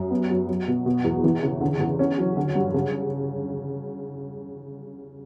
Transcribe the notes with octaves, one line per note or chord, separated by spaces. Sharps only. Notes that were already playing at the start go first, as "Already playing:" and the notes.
Already playing: F#2
B3
F#3
F#3
B2
B2
E2
E3
C#3
D3
E2
C#4
F#3
D3
G2
C#3